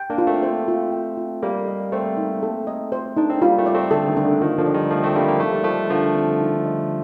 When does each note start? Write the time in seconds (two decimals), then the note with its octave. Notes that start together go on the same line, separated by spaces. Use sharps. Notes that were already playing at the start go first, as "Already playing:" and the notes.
Already playing: G5
0.10 A#3 D4
0.18 F4
0.27 A3 C4
0.43 C5
0.68 F4
0.92 G5
1.17 F4
1.43 G3 A#3 A4
1.67 D#5
1.92 A3 C4 C5
2.17 D#4
2.43 A4
2.67 D#5
2.92 C5
3.17 D4 D#4
3.30 C4
3.41 G3 A#3 F4
3.58 A3 C4
3.66 D5
3.75 A3 C4
3.91 D3 A4
4.08 D#3
4.17 D4
4.25 D3
4.41 D#3 F4
4.58 D3 F3
4.66 D5
4.74 D#3 G3
4.91 F3 A3 A4
5.03 A3 C4
5.16 G3 A#3 D4
5.28 A#3
5.40 A3 D#4
5.53 G3
5.64 F3 A3 D#5
5.90 D3 F3 A#4
6.15 C4
6.40 D#4
6.66 D#5